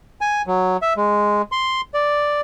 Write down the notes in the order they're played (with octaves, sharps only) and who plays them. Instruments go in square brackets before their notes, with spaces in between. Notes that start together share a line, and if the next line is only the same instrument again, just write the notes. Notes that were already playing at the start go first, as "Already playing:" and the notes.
[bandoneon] G#5
F#3
E5
G#3
C6
D5